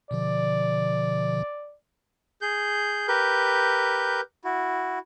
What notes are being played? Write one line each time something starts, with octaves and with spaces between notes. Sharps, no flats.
B2 D3 F3 D5
G#4 G6
G4 A#4 B4 G6
E4 F#4